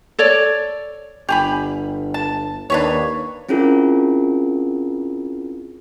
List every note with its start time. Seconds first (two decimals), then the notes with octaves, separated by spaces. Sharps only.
0.19 A4 C#5 D5
1.29 G1 G4 G#5 B5
2.14 A5
2.70 D#2 D4 B4 C#5
3.49 C4 C#4 E4 F4 G#4 A#4